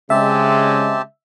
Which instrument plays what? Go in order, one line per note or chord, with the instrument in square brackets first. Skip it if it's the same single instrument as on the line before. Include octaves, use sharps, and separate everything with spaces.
[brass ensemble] C#3 G#3 [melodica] C4 G4 A5 [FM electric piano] E5